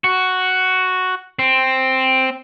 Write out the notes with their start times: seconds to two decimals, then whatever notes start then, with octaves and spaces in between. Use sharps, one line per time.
0.04 F#4
1.39 C4